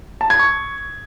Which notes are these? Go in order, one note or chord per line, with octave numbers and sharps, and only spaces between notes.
A5
G#6
C#6